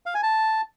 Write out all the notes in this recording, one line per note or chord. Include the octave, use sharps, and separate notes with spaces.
F5
G#5
A5